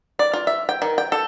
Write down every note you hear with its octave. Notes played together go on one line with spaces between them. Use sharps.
D5
F4
E5
G5
D#3
G5
A4